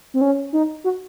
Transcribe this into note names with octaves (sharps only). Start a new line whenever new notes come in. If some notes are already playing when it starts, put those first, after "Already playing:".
C4
C#4
D#4
F#4